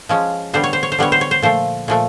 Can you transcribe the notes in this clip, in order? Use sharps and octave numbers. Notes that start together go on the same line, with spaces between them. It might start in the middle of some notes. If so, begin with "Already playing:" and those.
F3 G#3 C#4
D3 G3 B3 C5
C#5
C5
C#5
C5
D3 G3 B3 C#5
C5
C#5
C5
A#2 F3 A3 C5
A#2 F3 A3